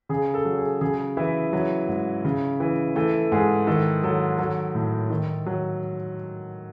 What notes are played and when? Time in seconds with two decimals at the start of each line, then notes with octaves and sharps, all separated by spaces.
0.09 C#3 G#4
0.34 A4
0.45 F#3
0.58 G#4
0.81 C#3 G#4
1.17 E3 E4
1.53 F#3
1.88 G#2
2.25 C#3
2.60 E3
2.95 E3 A3
3.32 G#2 G#4
3.67 D#3 A4
4.04 F#3 A4
4.38 F#3 A4
4.75 A2
5.10 D#3
5.46 F#3